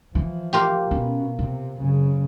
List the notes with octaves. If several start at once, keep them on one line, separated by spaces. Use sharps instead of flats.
E3 F3
A#3 F4 G4
B2 C#4
C3 C4
F#1 C#3